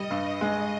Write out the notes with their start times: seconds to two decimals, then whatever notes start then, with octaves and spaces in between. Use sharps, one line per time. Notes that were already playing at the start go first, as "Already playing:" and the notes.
Already playing: G3 D#5
0.11 G2
0.41 G#3